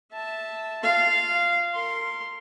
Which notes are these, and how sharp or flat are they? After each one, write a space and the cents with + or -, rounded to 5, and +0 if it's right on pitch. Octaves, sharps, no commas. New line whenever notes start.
E5 -10 A5 +0
F4 +0 F5 -15
A#4 -25 C6 +0